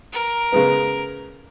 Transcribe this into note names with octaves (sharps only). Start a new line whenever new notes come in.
A#4
C#3 G#3 B3